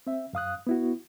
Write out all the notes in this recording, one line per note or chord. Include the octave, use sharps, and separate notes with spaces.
C4 E5
F#2 F5 D#6 F#6
B3 E4 F#4